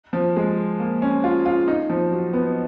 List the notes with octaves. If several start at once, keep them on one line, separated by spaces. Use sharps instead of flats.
F3
G#3
A#3
C#4
F4
F4
D#4
F3
F#3
B3